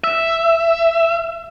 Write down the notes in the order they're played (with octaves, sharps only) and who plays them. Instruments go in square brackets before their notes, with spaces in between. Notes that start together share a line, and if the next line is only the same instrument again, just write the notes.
[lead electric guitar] E5